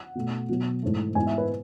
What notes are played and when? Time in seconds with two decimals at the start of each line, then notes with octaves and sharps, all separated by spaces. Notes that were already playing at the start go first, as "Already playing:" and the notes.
Already playing: F#5
0.15 B2 A3
0.49 B2 F#3 B3
0.83 G#2 E3 A3
1.15 G#2 E3 B3 G#5
1.27 E5
1.38 B4